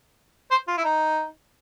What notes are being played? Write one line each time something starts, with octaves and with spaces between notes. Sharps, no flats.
C5
F4
E4
D#4